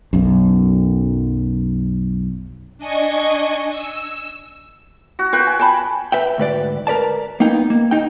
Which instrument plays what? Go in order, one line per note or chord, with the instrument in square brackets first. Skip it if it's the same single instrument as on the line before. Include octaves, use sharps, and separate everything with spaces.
[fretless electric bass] B1 F#2
[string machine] D4 D#5 G#5 C#6
E6
[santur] F#4
[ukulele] F4 B4 [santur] G5
[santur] G#5
[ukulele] G5 A5 B5
[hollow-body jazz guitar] B4 E5 G5
D2 G#2 B4 D5
A#4 B4 D5 A5
A#3 B3 D#4 G5
A#3
D#4 G5